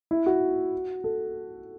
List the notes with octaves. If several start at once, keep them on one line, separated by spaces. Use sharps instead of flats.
E4
F#4
A4